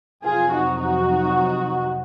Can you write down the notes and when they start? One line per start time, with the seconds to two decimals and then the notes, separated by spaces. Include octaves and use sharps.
0.23 F2 C3 F#3 F4 G#4
0.52 D#4 F#4
0.82 D#4 F#4